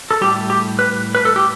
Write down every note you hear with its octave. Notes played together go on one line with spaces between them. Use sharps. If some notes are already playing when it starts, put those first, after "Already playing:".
A4
A2 G3 G4
G4
B4
B4
A4
G4